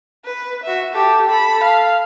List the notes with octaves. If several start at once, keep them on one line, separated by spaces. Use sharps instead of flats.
B4
F#4 E5
G4 A4
A4 B5
F5